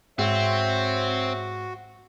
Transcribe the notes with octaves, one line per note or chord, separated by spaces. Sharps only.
G#2 C4 F#4 C#5 E5